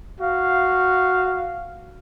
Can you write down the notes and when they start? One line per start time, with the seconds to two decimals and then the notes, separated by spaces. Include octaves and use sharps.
0.21 F#4 F5